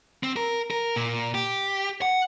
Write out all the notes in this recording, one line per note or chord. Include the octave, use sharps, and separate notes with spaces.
C4
A#4
A#4
A#2
G4
F#5